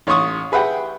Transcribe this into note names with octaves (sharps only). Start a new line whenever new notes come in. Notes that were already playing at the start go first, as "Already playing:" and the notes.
A1 C#5 C6 C#6 D#6
G#4 B4 E5 F#5 G5